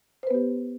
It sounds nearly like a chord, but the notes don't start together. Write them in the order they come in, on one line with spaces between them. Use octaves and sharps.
C5 B4 B3 G4